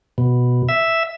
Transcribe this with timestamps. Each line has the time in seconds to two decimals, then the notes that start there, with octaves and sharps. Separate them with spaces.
0.18 B2
0.69 E5